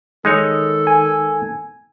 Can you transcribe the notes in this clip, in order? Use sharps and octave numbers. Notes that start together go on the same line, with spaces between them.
D#3 G#3 D#4 A4 C#5
G#5